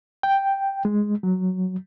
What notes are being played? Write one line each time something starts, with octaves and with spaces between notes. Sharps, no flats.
G5
G#3
F#3